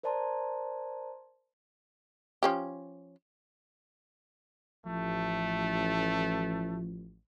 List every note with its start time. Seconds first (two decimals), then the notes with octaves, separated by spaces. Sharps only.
0.03 A#4 C5 D5 A5 A#5 C6
2.43 F3 C#4 G4
4.86 A1 F3 A3